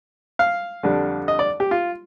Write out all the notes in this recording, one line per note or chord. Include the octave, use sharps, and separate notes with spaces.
F5
F2 D3 G3 D4
D#5
D5
G4
F4